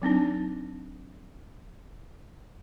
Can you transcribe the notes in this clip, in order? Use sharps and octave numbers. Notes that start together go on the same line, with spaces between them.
F#3 C4 D4 D#4